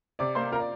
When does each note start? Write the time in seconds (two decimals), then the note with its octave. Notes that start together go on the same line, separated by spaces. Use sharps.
0.19 C3 D5 D6
0.35 A#3 C5 C6
0.52 F4 A#4 A#5
0.60 D5